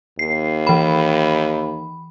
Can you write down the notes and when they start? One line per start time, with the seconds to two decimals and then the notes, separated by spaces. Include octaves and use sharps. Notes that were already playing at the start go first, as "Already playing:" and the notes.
0.19 D#2 C7
0.67 E3 B5